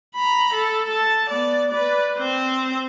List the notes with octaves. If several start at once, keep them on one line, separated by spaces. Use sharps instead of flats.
A#5 B5
A4
A5
B3 D5
B4 D5
C4 C5